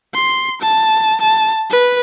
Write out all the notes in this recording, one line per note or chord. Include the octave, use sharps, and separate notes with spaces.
C6
A5
A5
B4